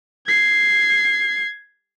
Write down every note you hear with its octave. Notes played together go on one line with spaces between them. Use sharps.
G#6 C7